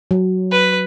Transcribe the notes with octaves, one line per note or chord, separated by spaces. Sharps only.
F#3
B4